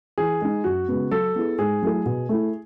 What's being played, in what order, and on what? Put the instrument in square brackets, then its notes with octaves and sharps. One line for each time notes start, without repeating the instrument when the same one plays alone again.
[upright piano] E3 [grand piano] G#4
[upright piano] G#3 D#4
[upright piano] F#2 [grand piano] F#4
[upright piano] C#3 G#3 B3
[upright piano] F#3 [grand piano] A4
[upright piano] B3 E4 G#4
[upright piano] G#2 [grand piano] G#4
[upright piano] F#3 A3 E4 A4
B2
A3 E4